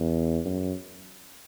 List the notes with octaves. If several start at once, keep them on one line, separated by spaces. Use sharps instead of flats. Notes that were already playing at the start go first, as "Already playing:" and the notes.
Already playing: E2
F#2